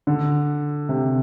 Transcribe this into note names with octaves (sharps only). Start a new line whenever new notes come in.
D3
C3